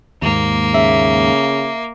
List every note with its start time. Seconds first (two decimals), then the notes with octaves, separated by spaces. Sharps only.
0.22 D#2 G#2 A#3
0.74 C#3 E5